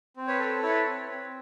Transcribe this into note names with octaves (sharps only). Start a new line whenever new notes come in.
C4
B4 C#5
A4
E4 B4 C#5
C4
C4